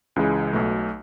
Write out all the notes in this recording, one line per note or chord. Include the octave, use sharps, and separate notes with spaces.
C#2 C#3 E3 G#3
B1 B2 A3